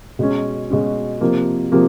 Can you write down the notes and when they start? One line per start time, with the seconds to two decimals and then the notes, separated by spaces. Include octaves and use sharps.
0.19 B2 G#3 C#4
0.70 B2 G#3 C#4
1.21 C3 F3 A#3
1.72 C3 F3 A#3